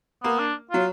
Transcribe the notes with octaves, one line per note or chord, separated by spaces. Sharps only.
A#3 B3
D4
F#3 F4